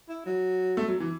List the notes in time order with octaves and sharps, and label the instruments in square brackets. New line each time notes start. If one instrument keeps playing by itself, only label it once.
[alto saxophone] E4
F#3
[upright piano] A3
F#3
E3